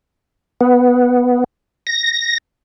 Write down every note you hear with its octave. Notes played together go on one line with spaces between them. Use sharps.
B3
A#6